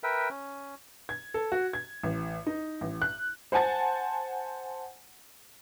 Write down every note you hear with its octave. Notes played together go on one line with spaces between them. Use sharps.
A#4 B4 E5 G5
C#4
G#6
A4
F#4
G#6
A1
D#4
A1
F#6
C5 F#5 G#5 A5 A6